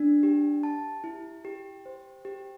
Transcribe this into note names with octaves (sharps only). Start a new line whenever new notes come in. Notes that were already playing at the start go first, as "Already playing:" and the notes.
Already playing: D4
G4
A5
E4
G4
C5
G4